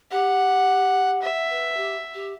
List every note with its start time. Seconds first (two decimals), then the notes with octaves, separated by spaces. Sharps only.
0.11 G4 F#5
1.22 E5
1.50 B4
1.77 G4
2.14 G4